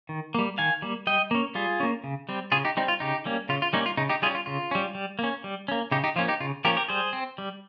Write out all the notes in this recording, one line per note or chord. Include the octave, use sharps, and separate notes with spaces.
D#3
G3 A#3
D#3 F5 G#5
G3 A#3
G3 D#5 G5
A#3 C#4
G3 F4 G#4
A#3 C#4
C#3
G3 C4
C#3 F4 G#4
D#4 G4
G3 C4 D#4
F4
C#3 D#4 G4
G3 A#3 C#4
C#3 F4
F4
G3 A#3 C#4 D#4
F4
C#3 D#4
D#4 G4
G3 C#4 F4 G#4
F4
C#3 F4
G3 C#4
G3
A#3 C#4
G3
A#3 C#4
C#3 D#4 G4
D#4 G4
F3 A#3 C#4 F4
D#4 G4
C#3 F4
F3 A#3 C#4 G4 A#4
G4 A#4
G3 G#4 C5
C4
G3